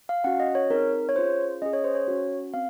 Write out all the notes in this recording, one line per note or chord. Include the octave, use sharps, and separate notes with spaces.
F5
C#4 F#4 F#5
D#5
C#5
C4 D#4 G#4 A#4
C#5
C#4 F4 G#4 C5
C#4 G#4 D#5
C#5
C5
C#5
C#4 F#4
C4 F5